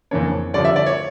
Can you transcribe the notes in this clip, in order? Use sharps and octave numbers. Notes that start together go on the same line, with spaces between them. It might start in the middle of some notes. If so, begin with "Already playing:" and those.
F2 C#3 E3 A#3 D4 C#5
G2 D3 F3 C#4 D5
E5
D5
C#5